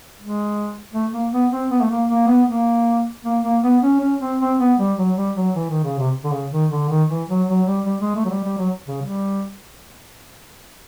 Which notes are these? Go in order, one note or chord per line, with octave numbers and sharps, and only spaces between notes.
G#3
A3
A#3
B3
C4
B3
A3
A#3
A#3
B3
A#3
A#3
A#3
B3
C#4
C#4
C4
C4
B3
G3
F#3
G3
F#3
E3
D#3
C#3
C3
D3
C#3
D#3
D3
D#3
E3
F#3
F#3
G3
G3
G#3
A3
F#3
G3
G3
F#3
C#3
G3